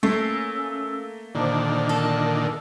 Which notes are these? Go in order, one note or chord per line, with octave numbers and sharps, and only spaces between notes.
A3 A#3 C#4 E6
A#2 D3 D#3 C5 A5 D6
A4 A#4 A5